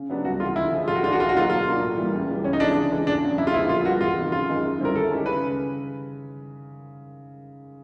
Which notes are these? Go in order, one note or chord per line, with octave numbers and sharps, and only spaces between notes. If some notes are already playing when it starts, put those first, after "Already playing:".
Already playing: C#3
F#3 B3 D4 G4
C2 F#4
C3 E3 F4
D3 E4
F3 G#3
A2 F4
F#4
E3 A3 D4 F4
F#4
D#2 F4
F#4
D3 F#3 A#3 D#4 F4
B2 F4
F#3 A#3 D4
A2
E3 G3 A#3
C#2
C#3 E3 G3
C#2 C#4
D#4
C3 E3 G#3 D4
C#3
E3 G#3
E2 D4
C#3 F#3
F2 E4
F4
D3 F3 G#3 B3 E4
A#2 F4
G3 B3 F#4
E2 F4
C3 D#3
F#2 F4
D#3 G#3
F#2
D3 G3 C4 E4 A#4
D#3 A4
G#3 C#4 E4 G4
C#3 B4